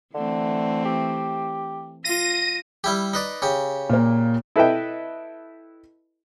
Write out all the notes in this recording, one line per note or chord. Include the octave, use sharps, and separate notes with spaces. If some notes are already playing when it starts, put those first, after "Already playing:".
D3 E3 A3 C4
G4
F4 A#6 D#7
G3 E4 G4
D#4 B4 D5
C#3 G4
A#2 A#3
E4 A4 B4 D#5 E5 G5